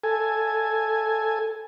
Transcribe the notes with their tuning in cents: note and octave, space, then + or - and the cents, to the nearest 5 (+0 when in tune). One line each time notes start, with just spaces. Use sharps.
A4 +0 G#5 +0